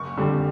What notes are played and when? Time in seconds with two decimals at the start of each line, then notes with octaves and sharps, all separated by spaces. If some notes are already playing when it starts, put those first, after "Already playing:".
Already playing: F#1 C#6
0.17 F2 D3 G3